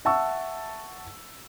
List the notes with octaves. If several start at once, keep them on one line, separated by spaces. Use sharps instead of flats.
E5 F#5 A5 C#6 E6